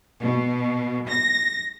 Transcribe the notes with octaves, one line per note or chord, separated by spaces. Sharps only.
B2
A#6